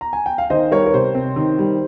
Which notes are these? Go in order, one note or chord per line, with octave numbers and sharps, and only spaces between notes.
A#5
G#5
G5
F5
D#3 C5 D#5
G3 A#4 C#5
A#4
C3 C5
C4
D#3
G3